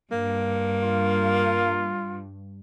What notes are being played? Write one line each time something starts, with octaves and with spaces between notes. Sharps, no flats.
G2 A#3
F4